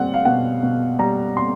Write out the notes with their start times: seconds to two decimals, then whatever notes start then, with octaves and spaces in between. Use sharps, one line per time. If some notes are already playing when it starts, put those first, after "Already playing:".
Already playing: G3 C4 F#5
0.14 F5
0.25 B2 F#5
0.63 B2
0.99 G3 A#5
1.37 C4 C6